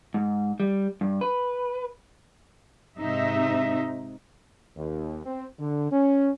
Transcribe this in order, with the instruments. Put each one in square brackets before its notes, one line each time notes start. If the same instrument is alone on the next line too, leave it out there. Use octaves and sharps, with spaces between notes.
[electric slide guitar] G#2
G3
G2
B4
[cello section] G#2 C3 D#4 E5
[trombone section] D#2
C4
D3
C#4